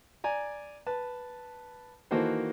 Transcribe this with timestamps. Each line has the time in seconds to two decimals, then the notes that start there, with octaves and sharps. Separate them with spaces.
0.24 D5 G#5 A#5
0.87 B4 A5
2.11 D#3 E3 A#3 F#4 A4 C5